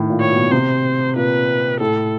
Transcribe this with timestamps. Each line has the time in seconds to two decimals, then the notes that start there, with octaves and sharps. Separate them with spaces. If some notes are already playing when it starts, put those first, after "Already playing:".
Already playing: A2 D#3
0.10 A#2
0.21 C#5
0.31 B2
0.52 C3 C5
1.16 A#2 B4
1.81 A2 A4